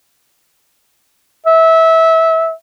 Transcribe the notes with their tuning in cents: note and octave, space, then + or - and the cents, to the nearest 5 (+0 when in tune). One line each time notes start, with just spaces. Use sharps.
E5 -20